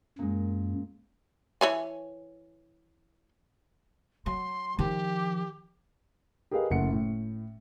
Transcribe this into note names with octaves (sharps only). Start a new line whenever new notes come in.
F#2 A#2 G#3
E3 C#5 G#5
F#3 C6
D#3 F3 G4
G4 G#4 A#4 B4 D#5 F5
F#1 A3 F#5 C#7
A2